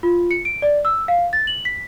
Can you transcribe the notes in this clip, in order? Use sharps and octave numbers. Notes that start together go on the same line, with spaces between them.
F4
C#7
D7
D5
E6
F5
A6
F#7
B6